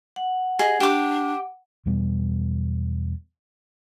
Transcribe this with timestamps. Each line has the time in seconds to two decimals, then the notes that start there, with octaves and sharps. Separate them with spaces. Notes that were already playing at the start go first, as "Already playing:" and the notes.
0.16 F#5
0.59 G#4 D#5
0.80 D4 G4 D6
1.86 E2 B2 G3 B3